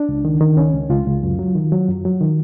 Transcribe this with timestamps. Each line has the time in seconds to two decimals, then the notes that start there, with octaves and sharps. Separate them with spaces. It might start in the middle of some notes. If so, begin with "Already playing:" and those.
Already playing: D4
0.09 C#2
0.25 D#3
0.41 D#3
0.57 C#2 C#4
0.73 C#2
0.90 C#2 F4
1.06 C#2
1.23 F#2
1.39 F#3
1.55 D#3
1.72 F#3
1.88 F#2
2.05 F#3
2.21 D#3